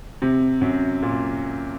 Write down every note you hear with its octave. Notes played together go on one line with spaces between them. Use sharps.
C3
F#2
A#2